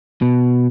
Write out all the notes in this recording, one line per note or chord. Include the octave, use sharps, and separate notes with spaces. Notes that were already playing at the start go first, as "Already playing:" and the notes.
B2